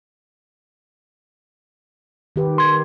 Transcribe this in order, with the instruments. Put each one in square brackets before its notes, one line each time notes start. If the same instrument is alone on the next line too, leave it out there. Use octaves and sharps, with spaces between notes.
[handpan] D#3 G4 B4
[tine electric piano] C6 G#6